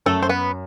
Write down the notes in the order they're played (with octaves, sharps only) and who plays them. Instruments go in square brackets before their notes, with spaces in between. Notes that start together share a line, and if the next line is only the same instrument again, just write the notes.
[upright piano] F#2 [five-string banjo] A3 A4
[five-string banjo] C5
B3 B4